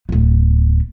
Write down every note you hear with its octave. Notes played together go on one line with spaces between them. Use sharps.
D1 B3